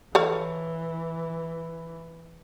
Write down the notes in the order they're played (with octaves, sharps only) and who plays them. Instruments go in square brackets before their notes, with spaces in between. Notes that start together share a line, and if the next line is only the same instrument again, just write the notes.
[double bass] E3 [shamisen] A4 C#5 F5